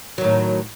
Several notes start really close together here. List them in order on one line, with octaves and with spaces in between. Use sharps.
F#3 D#3 A2